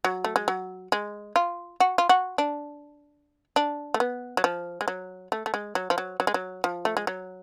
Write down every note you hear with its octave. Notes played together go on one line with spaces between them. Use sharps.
F#3
A3
G#3
F#3
G#3
F4
F#4
F4
F#4
D4
D4
A3
B3
F#3
F3
G#3
F#3
A3
A3
G#3
F#3
F3
F#3
F#3
G#3
F#3
F3
A3
G#3
F#3